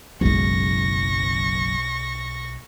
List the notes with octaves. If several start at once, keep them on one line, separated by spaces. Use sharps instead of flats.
F#1 B1 F#2 G#3 E4 C#6 A#6